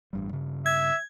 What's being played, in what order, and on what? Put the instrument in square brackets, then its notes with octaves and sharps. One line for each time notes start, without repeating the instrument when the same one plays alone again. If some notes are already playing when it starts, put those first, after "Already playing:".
[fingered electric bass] A1 G2 G3
G2 C#3
[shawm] E5 [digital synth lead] G#6